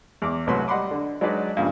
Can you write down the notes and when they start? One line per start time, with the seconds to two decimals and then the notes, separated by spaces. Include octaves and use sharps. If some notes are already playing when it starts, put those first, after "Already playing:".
0.22 E2 D6
0.47 C2 A2 F#3 B4 C6
0.68 G3 D#5 F#5 B5 C6 D6
0.91 D3
1.21 F#3 G#3 D4 D#4 B4 D5
1.57 G2 A#2 C#3 F3